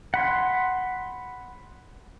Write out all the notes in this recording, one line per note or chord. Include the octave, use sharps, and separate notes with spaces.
F#5 B5 C6